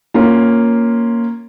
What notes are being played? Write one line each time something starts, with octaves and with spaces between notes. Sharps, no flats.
A#3 C#4 F4